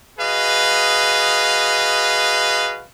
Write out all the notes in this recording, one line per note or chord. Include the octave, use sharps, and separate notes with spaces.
F#4 G#4 B4 D#5 F5